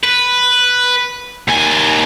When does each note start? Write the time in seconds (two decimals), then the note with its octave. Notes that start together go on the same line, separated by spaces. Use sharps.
0.04 B4
1.48 D#2 G#5